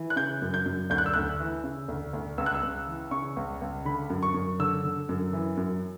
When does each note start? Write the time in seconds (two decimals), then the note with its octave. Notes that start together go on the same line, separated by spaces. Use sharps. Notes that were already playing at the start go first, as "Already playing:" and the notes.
Already playing: E3
0.10 F#6
0.16 C#3 G6
0.42 F#2
0.54 G6
0.66 F#2
0.90 D2 G6
0.98 F#6
1.06 E6
1.14 D2 F#6
1.40 E3
1.64 C#3
1.88 D2
2.13 D2
2.38 C#2 E6
2.46 F#6
2.54 E6
2.63 C#2
2.87 E3
3.11 C#3 C#6
3.37 C#2
3.62 C#2
3.85 D3 B5
4.10 F#2
4.23 C#6
4.34 F#2
4.59 D3 E6
4.84 D3
5.09 F#2
5.33 E3
5.57 F#2